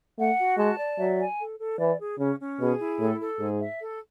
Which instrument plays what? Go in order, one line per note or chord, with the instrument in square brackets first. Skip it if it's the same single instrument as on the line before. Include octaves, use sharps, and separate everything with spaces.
[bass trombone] A3 [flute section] F#5
[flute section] F#4
[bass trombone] G#3 [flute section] A5
[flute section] D5
[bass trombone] F#3 [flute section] E5
[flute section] G#5
A4
A4
[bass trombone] E3 [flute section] D5
[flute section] G#4
[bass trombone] C#3 [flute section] C#4
[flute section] C#4
[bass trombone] B2 [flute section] G#4
[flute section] E4
[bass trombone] A2 [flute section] A4
[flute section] A4
[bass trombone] G#2 [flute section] G#4
[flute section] E5
A4